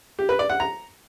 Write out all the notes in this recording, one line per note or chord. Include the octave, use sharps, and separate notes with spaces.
G4
B4
D5
F#5
A#5